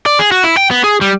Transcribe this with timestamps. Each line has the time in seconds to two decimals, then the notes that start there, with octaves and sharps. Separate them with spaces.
0.06 D5
0.19 G#4
0.32 F#4
0.44 E4
0.57 G5
0.71 B3
0.84 G#4
1.01 G3